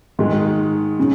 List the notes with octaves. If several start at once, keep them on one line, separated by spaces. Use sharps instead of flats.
G#2 D#3 G#3
C#3